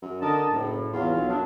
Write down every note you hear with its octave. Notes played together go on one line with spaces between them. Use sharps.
F#2
D3 A#4 D#5 A5
F#1 A2
E2 F#3 F4 F5
B1
F#2 F#3 B3 D4